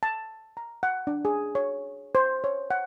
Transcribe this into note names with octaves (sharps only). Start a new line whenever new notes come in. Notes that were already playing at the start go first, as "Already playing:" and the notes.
A5
A#5
F#5
D4
G#4
C#5
C5
C#5
F#5